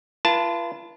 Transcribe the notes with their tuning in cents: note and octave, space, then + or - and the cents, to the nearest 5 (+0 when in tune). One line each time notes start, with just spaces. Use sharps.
F4 -35 B4 -35 A5 +0